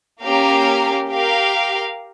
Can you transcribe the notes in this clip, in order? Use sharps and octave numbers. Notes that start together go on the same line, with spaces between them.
A#3 C#4 G4 A#4 F5
G4 A#4 F5